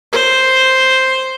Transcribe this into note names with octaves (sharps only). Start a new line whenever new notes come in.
C5